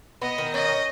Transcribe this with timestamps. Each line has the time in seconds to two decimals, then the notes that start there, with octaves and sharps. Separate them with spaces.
0.22 B3 D#5
0.38 D#3
0.54 C#4 D#5
0.68 C#4